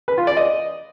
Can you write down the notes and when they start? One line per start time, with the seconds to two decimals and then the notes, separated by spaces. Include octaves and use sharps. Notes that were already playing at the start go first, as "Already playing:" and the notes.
0.08 B4
0.18 F4
0.27 D5
0.37 D#5